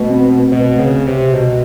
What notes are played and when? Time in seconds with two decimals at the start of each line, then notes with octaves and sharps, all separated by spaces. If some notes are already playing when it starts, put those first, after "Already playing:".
Already playing: B2 A3
0.10 C4
0.52 C#2 B2
0.79 C#3
0.93 C#2
1.06 C3
1.33 C#2 B2